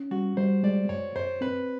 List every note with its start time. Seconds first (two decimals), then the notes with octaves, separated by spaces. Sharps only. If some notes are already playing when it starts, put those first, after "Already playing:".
Already playing: C#4
0.11 G3 F#4
0.37 G3 C5
0.63 G#3 D5
0.89 F#2 C#5
1.15 F#2 C5
1.41 C4 B4